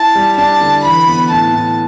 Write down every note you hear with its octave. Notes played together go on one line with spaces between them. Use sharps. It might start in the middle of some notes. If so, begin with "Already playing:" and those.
Already playing: E4 A5
G3
D4 A5
D3
E3 B5
B3
A2 A5
A2